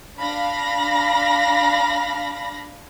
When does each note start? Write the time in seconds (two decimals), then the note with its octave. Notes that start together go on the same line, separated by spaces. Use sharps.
0.20 D4 F5 B5 A#6